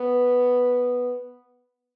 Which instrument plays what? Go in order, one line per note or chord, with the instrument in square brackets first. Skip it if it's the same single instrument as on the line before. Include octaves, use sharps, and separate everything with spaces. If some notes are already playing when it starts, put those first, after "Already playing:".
Already playing: [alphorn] B3